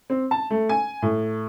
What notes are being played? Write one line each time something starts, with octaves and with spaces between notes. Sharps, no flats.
C4
A5
A3
G#5
A2